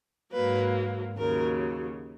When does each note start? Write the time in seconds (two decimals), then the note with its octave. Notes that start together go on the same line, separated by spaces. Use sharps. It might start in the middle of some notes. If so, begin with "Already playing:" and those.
0.33 G#2 F#3 A#3 B4
1.17 D#2 C#3 F#3 A#4